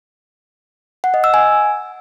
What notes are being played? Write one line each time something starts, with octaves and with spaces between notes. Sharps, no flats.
F#5
D#5
E6
G#5